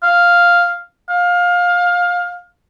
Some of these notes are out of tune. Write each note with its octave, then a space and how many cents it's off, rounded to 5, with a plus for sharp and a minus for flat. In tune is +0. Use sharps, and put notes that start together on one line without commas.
F5 +0
F5 +20